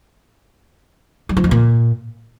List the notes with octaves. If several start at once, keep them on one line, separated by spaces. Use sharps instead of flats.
G3
F3
F2
A#2